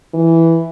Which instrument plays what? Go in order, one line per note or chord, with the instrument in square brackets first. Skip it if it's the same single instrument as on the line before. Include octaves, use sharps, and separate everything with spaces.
[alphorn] E3